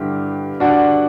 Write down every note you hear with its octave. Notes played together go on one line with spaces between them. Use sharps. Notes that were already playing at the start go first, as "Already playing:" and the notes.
Already playing: G2 D3 E4 G4
D4 F#4